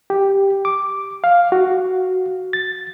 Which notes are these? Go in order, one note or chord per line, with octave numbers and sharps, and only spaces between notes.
G4
D6
F5
F#4
A6